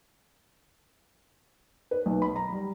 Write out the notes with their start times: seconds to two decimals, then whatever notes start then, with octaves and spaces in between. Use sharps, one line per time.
1.91 B4
2.06 B1
2.22 B5
2.36 A#5
2.52 G3